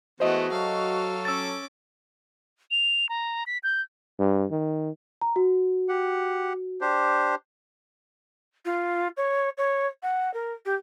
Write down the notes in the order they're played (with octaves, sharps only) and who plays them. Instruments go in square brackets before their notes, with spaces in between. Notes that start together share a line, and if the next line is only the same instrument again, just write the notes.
[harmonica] E3 B3 [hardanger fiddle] G#3 A3 [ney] F#4 [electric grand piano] C5 D#5
[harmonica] F#3 A4 [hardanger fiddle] F5
[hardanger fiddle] C#4 D6 [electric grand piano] E6 A6
[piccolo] F7
A#5
B6
G6
[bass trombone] G2
D#3
[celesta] A#5
F#4
[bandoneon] G4 F#5
D4 G4 C5
[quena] F4
C#5
C#5
F#5
A#4
G4